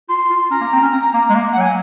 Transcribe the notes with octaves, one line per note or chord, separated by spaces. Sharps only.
F4 C6
F4
C#4 A#5
A#3
C4
C#4
C4
A#3
G#3
A#3
F#3 F#5
G#5